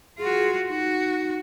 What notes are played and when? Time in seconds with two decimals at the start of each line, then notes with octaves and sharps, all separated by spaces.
0.18 F4 F#4 G#4
0.68 D#4 F#4